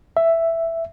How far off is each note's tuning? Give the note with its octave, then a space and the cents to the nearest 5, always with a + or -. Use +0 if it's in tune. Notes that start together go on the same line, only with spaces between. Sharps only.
E5 +5